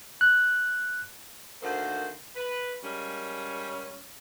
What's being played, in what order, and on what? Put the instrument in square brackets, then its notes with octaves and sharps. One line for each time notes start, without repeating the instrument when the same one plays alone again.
[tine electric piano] F#6
[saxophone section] D2 D#3 A#3 C5
B4
G3 G#3 A#3 C#4